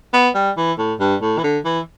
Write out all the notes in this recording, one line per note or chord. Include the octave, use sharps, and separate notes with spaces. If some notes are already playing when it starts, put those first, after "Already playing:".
B3
G3
E3
A2
G2
A2
E3
D3
E3